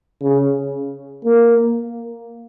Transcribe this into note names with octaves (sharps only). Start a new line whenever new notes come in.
C#3
A#3